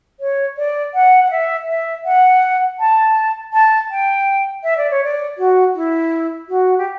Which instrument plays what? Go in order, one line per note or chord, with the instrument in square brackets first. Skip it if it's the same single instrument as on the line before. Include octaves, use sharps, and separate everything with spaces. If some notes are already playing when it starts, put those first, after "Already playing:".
[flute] C#5
D5
F#5
F#5
E5
E5
F#5
A5
A5
G5
E5
D5
C#5
D5
F#4
E4
F#4
G4